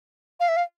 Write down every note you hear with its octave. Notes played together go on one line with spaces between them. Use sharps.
F5
E5
F5